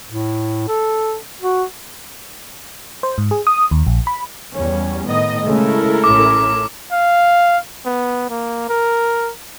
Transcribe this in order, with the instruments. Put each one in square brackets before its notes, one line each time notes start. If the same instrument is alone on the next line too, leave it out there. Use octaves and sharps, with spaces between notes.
[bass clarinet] A2
A4
F#4
[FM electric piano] C5
G#2
G#4
D#6
D#2
A#1
B5
[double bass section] E2 G3 C#4
[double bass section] A2 D#3 B3 [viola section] D#5
[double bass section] C#3 G#3 A3 [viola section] E4 A4 A#4
[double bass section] A1 C#4 [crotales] D6
[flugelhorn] F5
B3
A#3
A#4